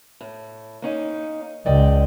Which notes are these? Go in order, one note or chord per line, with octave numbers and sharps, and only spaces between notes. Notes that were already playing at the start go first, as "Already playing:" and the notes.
A2
A#3 C#4 D#4
C#2 D5 D#5 G5